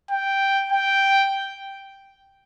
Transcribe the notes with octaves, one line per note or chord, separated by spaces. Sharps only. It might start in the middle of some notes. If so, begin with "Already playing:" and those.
G5
G5